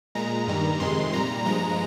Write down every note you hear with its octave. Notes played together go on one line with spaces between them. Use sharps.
A#2 G#3 A#5
G2 D#3 G3
F2 C3 D#3 G#3 C6
A#2 G3 A#5
G2 F3 G#3 A#5